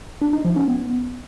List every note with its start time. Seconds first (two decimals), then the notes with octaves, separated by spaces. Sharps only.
0.22 D4
0.33 D#4
0.45 F3
0.56 C#4
0.68 B3